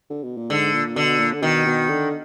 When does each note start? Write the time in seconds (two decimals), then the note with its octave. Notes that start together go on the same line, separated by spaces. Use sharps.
0.10 D3
0.23 B2
0.37 A#2
0.50 G#2 D3
0.73 A#2
0.96 B2 D3
1.20 A#2
1.33 D3
1.42 B2 D#3
1.66 B2
1.89 D3